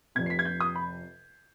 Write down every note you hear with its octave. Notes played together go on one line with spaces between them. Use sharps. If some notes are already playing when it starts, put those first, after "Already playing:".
F1 F2 C3 G#6
C7
B6
G#6
G6
D#6
B5